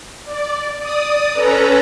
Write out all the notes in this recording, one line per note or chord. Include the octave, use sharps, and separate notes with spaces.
D5
D5 D#6
C#4 A4 B4 A#5